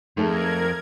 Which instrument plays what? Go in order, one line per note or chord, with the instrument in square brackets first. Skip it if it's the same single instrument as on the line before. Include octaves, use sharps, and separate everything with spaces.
[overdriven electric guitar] F2 [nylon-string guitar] A3 A5 [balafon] D#4 G#4 [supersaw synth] A#4 G#6